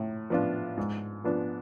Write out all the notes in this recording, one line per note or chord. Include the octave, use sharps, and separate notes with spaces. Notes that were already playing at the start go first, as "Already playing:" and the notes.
Already playing: A2
F3 B3 D4 F4
G#2
F3 B3 D4